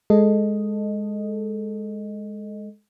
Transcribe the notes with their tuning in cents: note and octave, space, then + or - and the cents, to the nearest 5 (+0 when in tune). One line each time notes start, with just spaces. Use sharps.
G#3 +5 A4 +0 D#5 +0